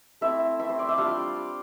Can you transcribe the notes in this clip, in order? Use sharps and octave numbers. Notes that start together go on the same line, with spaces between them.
A3 C4 E4 E5
A3 C4 E4 E5
C5
D5
E5
G3 D4 F4 F5
G5